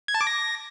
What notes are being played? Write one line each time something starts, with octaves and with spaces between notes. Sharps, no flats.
G#6
A5
D6
A#6